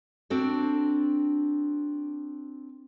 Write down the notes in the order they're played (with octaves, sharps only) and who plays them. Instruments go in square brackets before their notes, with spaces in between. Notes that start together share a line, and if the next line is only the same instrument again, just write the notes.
[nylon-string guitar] C4 D4 F#4 A4